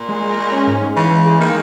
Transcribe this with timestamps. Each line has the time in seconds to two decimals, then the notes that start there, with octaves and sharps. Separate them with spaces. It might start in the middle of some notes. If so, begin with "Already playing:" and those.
Already playing: A#2
0.09 G#3
0.22 G#3
0.38 G#3
0.52 C#4
0.67 G#2
0.82 G#3
0.96 C#3 E3
1.11 E3
1.26 G#3
1.40 D#3 A#3